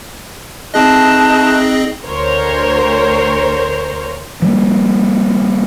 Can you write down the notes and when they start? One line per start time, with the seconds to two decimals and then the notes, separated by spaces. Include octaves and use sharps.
0.74 A3 C4 D#4 G#4 B4 D#5 A5
2.05 D2 A#4 C5 C#5
4.42 F3 G3 A#3